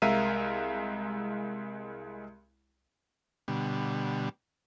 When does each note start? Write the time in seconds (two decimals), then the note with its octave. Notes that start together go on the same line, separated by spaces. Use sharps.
0.02 C2 G#3 A#4 E5 F5 D#7
3.48 B2 D3 G3